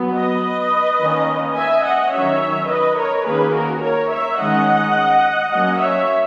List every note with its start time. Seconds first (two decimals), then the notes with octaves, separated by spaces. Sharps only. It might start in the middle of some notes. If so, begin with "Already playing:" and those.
Already playing: F#3 B3
0.16 B4 D#5
1.00 D#3 A#3 C#4
1.57 E5 G#5
1.85 D#5 F#5
2.13 D#3 F#3 C#4 C#5 E5
2.69 B4 D#5
2.98 A#4 C#5
3.26 D#3 A#3 C#4 G#4 B4
3.54 F#4 A#4
3.83 A#4 C#5
4.11 C#5 E5
4.39 D#3 G#3 C#4 D#5 F#5
5.51 F#3 A#3 C#4 D#5 F#5
5.80 C#5 E5